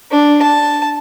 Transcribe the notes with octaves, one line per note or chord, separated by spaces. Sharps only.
D4
A5